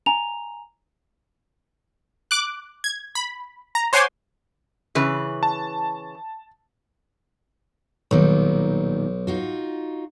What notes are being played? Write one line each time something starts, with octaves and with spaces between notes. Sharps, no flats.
G#5 A#5 F7
D6 F#6
G#6
B5
A#5
C5 C#5 F#5 G#5 C6 D6
C#3 E3 B4
A5
B1 A#2 D#3 G3
D#4 F4 F#4